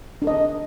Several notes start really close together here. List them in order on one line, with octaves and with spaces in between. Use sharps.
D4 A#4 D#5